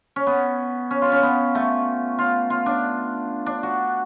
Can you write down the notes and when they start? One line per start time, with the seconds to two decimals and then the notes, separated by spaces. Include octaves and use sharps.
0.16 C#4
0.27 B3
0.91 C#4
1.02 F4
1.12 C#4
1.23 B3
1.55 A3
2.19 F4
2.50 F4
2.66 D4
3.46 D4
3.63 F#4